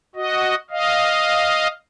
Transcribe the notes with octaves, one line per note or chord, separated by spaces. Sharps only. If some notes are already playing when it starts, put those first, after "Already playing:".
F#4 D#5
D#5 F5